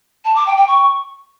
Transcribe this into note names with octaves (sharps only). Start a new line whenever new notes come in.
A5
D6
G5
G5
C#6